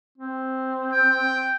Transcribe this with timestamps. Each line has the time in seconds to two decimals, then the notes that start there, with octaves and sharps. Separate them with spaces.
0.18 C4
0.92 G5